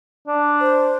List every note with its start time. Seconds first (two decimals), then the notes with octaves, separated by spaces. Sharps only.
0.27 D4
0.60 C5